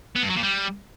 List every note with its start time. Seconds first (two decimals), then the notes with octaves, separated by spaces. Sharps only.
0.16 B3
0.22 G2
0.29 F#3
0.36 A#2
0.43 G3